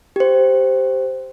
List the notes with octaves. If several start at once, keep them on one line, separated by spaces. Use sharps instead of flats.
G4 C5